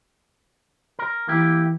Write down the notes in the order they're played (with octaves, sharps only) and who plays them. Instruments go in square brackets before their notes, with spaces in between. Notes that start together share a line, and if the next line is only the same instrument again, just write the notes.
[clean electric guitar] A#4
[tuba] E3 [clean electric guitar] A#3 E4 G4